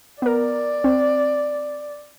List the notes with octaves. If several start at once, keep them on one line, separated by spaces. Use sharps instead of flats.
B3 A#4 D5
C4